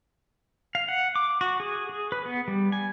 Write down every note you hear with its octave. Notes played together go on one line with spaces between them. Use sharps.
F5
F#5
D6
F#4
G#4
G#4
B4
B3
G3
G#5